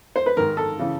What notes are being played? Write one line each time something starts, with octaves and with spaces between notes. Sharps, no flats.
C5
B4
G#2 D#3 A#4
A4
C#3 E3